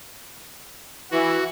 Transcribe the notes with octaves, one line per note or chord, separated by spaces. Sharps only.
E3 F#4